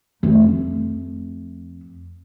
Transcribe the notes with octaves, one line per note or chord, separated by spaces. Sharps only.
F2 A3